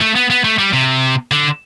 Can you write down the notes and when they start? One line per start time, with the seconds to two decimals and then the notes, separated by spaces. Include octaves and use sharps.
0.01 A3
0.15 B3
0.30 B3
0.44 A3
0.59 G3
0.73 C3
1.31 D3